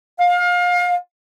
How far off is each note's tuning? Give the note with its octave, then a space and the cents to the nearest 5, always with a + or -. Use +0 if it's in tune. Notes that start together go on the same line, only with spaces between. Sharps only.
F5 +30